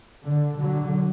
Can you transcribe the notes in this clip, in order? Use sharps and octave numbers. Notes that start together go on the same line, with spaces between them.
D3
D3 F#3